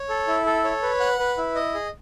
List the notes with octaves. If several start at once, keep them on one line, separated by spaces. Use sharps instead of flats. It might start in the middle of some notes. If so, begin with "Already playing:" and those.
Already playing: C#5
A4
E4
A4
C#5
B4
F#5
B4
E4
D#5
G#4